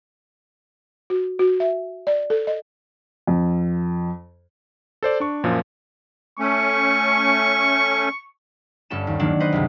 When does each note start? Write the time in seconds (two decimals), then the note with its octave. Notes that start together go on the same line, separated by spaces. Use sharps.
1.10 F#4
1.39 F#4
1.60 E5
2.07 D5
2.30 A4
2.47 D#5
3.27 F2
5.03 A4 C5 D5
5.20 D4 C#6
5.43 F#2 A#2 F3
6.39 A3 C#4 C#6
8.90 G1 G2 C#4 A4 E7
9.07 D#2
9.20 D#3 F#3 A#3 D4
9.40 B4 C5 D#5 F#5
9.52 F#1 C2